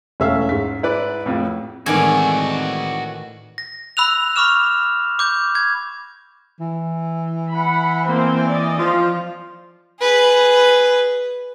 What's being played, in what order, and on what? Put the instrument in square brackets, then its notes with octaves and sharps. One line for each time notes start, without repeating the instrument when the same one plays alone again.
[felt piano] E1 A3 E6 [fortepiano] C#4 E5 F5
[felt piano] G#2 B6
[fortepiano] E4 B4 D5
A#1 F2 A2
[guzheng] A2 D#3 E3 [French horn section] G#3 C4 [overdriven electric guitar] F#4 D5 [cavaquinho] G#5
[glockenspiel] A#6
B5 E6 F#6 F7
B5 C#6 D6 F6 E7
D6 G6
G#6
[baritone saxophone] E3
[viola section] F#5 B5
A#3 C4 C5
D5 D#5
[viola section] F3 [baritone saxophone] F4
[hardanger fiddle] G#4 B4